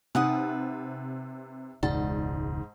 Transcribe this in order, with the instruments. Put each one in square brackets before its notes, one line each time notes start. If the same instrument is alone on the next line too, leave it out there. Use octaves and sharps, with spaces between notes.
[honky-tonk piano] C3 [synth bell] D#4 G#5 [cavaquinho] B4 F#5 D#6
[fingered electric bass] E1 C#2 [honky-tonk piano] G#2 [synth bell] D5 F#5 [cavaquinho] A5